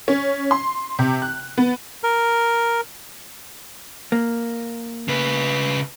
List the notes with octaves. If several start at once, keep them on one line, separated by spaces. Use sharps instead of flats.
C#4
C6
C3
F#6
B3
A#4
A#3
C#3 B4